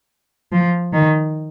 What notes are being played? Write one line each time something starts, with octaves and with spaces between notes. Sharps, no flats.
F3
D#3